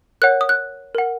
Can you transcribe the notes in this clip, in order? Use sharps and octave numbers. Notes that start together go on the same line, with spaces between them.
A#4 C#5 F#5 F#6
D#6
F#6
A#4 F#5